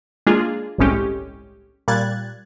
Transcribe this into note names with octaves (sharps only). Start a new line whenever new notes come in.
G#3 A#3 D4 F4 G#4
G1 C2 A2 G#3 C#4 G4
A#2 G3 F#6 G#6 A6